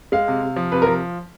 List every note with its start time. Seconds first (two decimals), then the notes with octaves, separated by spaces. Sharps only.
0.12 G#3 F5
0.28 C3
0.43 C3
0.56 F3
0.72 C3 B4
0.82 F3 A#4